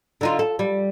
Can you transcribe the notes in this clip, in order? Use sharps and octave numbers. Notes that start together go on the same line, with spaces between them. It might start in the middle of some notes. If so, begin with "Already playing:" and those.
D3 D#4 F4
A4
G3